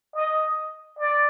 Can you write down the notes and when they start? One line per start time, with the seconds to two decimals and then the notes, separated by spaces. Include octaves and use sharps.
0.15 D#5
0.98 D5